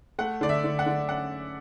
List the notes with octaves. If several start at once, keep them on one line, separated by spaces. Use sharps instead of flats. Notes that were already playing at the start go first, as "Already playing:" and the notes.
A3 F#5
D3 D5
E5
D3
F#5
D3
C#4 F#5